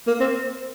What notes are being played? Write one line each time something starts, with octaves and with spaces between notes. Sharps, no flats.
A#3
C4